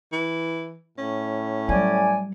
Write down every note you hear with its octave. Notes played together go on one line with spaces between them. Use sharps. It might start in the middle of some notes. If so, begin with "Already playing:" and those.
E3
A2 C#4
F#3 G3 D5 G#5